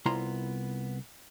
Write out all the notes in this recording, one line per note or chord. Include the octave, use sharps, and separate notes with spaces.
C2 B3 E4 F4 A#5 C6